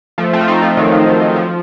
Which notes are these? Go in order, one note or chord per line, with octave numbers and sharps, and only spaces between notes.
F3 A3
A3 C4
F4
C4 D#4
F3 A3
D#3 F#3
F3
D#3
D#3
F3